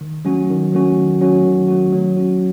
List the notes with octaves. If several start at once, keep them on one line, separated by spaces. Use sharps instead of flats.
D#3
F#3 A3 C#4 F#4
D#3
F#3 A3 C#4 F#4
D#3
F#3 A3 C#4 F#4
D#3
F#3 A3 C#4 F#4
F#3
C#4 F#4